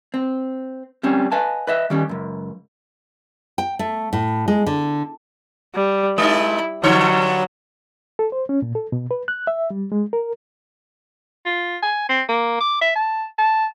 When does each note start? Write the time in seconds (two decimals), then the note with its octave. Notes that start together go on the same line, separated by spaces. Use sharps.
0.14 C4
1.03 G3 C4 C#4
1.32 B4 D#5 F5 G#5 A5
1.67 B4 D#5 E5
1.90 D#3 G3 C#4
2.09 C#2 F#2
3.58 G5
3.79 A3
4.13 A2
4.48 G#3
4.66 D3
5.74 G3
6.18 G#3 D#4 E4
6.83 G2 D3 F#3 C#5
8.19 A4
8.32 C5
8.49 C#4
8.62 A#2
8.75 A4
8.92 B2
9.11 B4
9.28 F#6
9.47 E5
9.70 G3
9.92 G#3
10.13 A#4
11.46 F4
11.82 G#5
12.09 C4
12.29 A#3
12.60 D6
12.81 E5
12.95 A5
13.38 A5